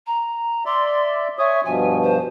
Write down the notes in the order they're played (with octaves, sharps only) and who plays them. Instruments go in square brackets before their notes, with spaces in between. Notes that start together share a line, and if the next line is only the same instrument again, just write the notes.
[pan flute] A#5
[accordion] D5 E5 [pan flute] C6
[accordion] C#5 G#5 D#6 [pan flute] E5
[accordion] G2 B2 F3 [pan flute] G#5
[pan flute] C5